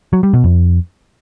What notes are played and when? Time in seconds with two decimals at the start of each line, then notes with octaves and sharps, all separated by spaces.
0.13 F#3
0.23 G3
0.33 B2
0.44 F2